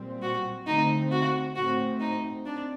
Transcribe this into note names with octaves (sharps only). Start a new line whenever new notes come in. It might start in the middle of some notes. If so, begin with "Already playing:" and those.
Already playing: A#2 G3 C4
F#4
D3 A3 C4 D#4
F#4
A2 A3 C4 F#4
D#4
C4 D4